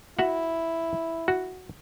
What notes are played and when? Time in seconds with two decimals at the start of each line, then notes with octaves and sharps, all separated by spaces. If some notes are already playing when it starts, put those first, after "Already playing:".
0.19 E4 F#4 E5 F#5
1.28 F#4